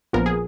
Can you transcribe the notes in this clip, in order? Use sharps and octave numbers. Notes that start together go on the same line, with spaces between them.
A#1 A#2 F3 B3 A#4
G#4